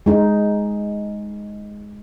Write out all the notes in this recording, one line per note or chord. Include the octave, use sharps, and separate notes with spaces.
G#3 D#4